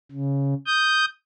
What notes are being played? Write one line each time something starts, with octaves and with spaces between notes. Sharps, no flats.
C#3
D#6 G6